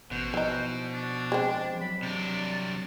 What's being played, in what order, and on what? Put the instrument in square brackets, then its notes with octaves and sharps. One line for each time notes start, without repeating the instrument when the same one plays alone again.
[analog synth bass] A1 [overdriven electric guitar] B2 [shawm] C5
[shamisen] E3 D#4 [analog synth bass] F3
[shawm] D4
[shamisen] G#3 C4
[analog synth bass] F#3 [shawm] B5
[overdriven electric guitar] C3 D4 [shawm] D5